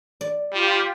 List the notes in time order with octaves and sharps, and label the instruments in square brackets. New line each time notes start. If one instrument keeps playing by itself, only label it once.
[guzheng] D5
[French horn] G3 [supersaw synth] F4 G4